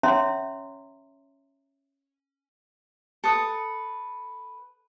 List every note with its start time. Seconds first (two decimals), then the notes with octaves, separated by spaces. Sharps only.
0.03 C#4 C#5 E5 A#5 C6
3.24 A4 B4 D#6